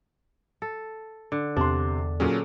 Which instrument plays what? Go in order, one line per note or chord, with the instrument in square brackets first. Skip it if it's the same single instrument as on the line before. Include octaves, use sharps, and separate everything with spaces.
[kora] A4
D3
[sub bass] E2 [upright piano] C3 C6 [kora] D4
[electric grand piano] A#2 F#3 C#4 [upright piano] G#4 A4